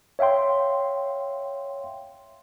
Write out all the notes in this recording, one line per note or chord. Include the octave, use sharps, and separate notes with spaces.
C#5 E5 F5 G5 C6